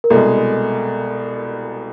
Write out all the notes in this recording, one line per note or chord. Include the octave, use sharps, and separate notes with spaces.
A#4
C2 B2 G#3 A4